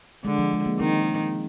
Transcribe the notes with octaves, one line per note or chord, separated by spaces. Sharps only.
D3 G#3
F3
G#3
A#3
D#3 C4